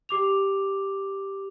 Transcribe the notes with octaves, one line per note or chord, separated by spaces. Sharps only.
G4 D6 F7